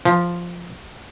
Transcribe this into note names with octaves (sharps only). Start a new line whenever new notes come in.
F3